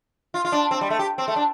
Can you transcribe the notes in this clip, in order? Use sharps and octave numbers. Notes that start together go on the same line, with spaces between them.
F4
F4
D4
C4
G3
A3
G4
C4
A3
D4